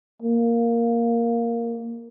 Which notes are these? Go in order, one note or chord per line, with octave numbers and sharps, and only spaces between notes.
A#3